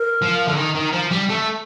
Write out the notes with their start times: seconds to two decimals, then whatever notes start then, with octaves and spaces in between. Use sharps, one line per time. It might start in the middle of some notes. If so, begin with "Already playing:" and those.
Already playing: A#4
0.22 F3
0.48 D3
0.57 D#3
0.75 D#3
0.93 F3
1.11 G3
1.30 A3